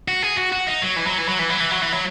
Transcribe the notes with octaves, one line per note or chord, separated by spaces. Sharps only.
F#4
G#4
F#4
F#4
D#4
F#3
E3
F#3
E3
F#3
E3
F#3
E3
F#3
E3
F#3